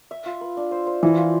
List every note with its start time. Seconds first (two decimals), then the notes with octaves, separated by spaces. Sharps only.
0.11 E5
0.26 F4
0.41 B4
0.57 D4
0.71 C5
0.87 C5
1.03 E3 F3
1.18 F3